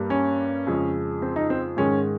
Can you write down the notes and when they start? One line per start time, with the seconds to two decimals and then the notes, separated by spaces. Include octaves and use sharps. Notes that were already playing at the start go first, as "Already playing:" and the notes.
Already playing: G2 G3 A#3
0.10 C#4
0.67 F2 C#3 G#3
1.22 C4
1.36 D#4
1.50 C4
1.77 G#2 D#3 G#3 C#4